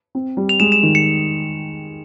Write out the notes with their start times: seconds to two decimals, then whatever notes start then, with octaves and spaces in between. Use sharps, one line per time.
0.15 C4
0.37 G3
0.49 F7
0.60 G#3 E7
0.72 E7
0.83 D#3
0.95 C#7